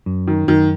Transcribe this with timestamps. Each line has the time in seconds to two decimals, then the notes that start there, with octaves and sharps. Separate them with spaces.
0.06 F#2
0.27 D#3
0.47 F#2 D#3